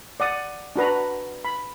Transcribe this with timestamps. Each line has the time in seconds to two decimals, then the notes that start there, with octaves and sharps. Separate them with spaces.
0.20 D5 F#5 D#6
0.76 D4 F#4 B4 A#5
1.45 B5